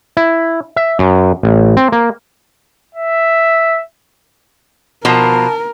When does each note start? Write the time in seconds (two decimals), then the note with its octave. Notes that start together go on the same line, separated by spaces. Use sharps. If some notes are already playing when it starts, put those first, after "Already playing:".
0.17 E4
0.76 E5
0.99 F#2
1.43 A1
1.77 C4
1.92 A#3
2.95 E5
5.05 B2 F3 A#4 A5